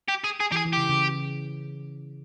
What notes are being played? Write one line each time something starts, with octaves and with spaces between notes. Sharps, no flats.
G4
G#4
G#4
E3 G4
G#4
E3
C#3 G4
C#3